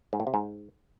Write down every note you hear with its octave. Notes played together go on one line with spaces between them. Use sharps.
G#2
A2
C3
G#2